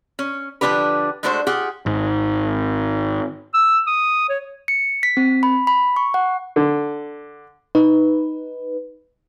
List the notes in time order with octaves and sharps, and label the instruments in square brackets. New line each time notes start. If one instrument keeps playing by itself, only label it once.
[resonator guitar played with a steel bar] C#4
D3 F3 C#4 D4 G4 B4
G#3 A3 D4 F#4 A4 C5
F4 G4 G#4 F#5
[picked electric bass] G#1
[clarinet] E6
D#6
C#5
[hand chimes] C#7
B6
C4
B5
B5
C#6
F#5
[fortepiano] D3
[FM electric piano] D#4 B4